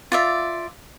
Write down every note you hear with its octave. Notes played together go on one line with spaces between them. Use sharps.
F4 D5 E5